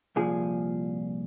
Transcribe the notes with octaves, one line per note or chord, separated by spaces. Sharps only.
C2 A#2 F3 G#4